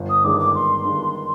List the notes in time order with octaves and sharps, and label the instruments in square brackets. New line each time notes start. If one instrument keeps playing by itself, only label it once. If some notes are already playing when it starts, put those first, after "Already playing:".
Already playing: [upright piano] G1
[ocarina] D#6
[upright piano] G2 D#3 G#3 D4 [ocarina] D6
[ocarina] D6
[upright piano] G1 [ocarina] C6
[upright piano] G2 D#3 G#3 D4